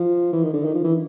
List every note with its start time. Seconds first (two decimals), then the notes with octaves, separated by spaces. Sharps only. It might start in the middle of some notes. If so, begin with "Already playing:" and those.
Already playing: F3
0.33 E3
0.43 D#3
0.53 D3
0.65 D#3
0.75 F3
0.84 E3